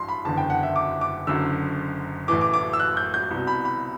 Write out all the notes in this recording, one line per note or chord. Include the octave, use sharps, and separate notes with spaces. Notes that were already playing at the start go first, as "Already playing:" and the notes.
Already playing: A1 G2 C6
B5
F#1 E2 D3 A5
G5
F#5
E5
D6
D6
F#1 F#2 D3 E6
A1 A2 E3 D6
D6
D6
E6
F#6
G6
G6
C2 B2
B5
B5